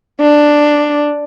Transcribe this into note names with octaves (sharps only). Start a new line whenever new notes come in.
D4